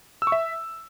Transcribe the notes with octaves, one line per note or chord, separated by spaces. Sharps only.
E6
C#6
E5